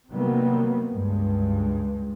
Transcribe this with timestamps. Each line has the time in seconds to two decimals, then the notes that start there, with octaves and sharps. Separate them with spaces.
0.10 C3 D#3 F#3 G3 A#3 B3
0.91 C#2 G2 G#3